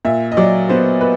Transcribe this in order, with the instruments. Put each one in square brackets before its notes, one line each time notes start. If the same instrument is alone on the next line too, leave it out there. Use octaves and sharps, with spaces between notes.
[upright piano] A#2 E5
D#5
F#3 D5
B3 C5
B4